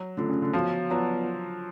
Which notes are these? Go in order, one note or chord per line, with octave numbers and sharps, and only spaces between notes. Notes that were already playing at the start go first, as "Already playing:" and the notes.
Already playing: F#3
D3 A3 C#4 F4
C#3
D3
F3 B3 F#4 C#5 F5
F#3 B3 F4 B4 D5 F#5